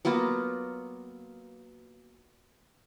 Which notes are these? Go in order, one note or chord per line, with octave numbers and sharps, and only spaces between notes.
F#3 A#3 B3 F4